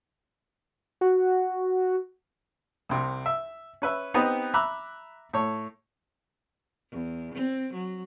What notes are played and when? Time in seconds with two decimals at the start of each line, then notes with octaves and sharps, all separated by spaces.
1.01 F#4
2.89 C2 C3
3.26 E5
3.82 C#4 B4 E5
4.14 B3 C4 D#4 G4 B4
4.54 E5 A#5 B5 D6 F#6
5.33 A2 C#5
6.91 E2
7.35 C4
7.74 F#3